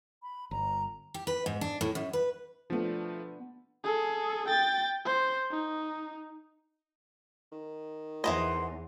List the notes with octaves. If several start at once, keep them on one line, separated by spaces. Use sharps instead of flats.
B5
G1 A#5
G4
B4
G#2
D4
A2
F#2
B4
F3 A3 B3 D4
G#4 A4
G5 A6
C5
D#4
D#3
E2 E3 C4 C5 D#5 F#5 C6